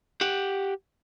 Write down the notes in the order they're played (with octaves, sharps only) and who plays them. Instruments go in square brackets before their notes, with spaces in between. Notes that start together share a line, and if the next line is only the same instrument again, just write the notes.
[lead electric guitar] G4 F#5